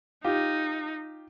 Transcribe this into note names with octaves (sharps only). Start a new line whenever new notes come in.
D#4 F4 G4